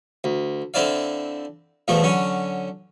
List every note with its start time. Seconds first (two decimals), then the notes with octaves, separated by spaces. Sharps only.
0.24 D2
0.74 D3 C4 E4 D5 F5
1.88 E2 B2 F3 A3
2.03 D3 F#3 C#4